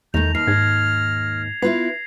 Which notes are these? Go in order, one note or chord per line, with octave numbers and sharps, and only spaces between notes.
E2 D#3 A3 G6 A#6 F7
D#2 F6 C7
G#2 G#6 A#6
B3 E4 F4 B4 C7